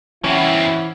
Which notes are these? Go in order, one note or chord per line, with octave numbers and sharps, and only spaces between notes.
B2 E3 C4 C#4 E4 F#5